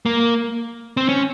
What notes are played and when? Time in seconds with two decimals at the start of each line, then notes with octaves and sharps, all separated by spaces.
0.06 A#3
0.97 C4
1.09 C#4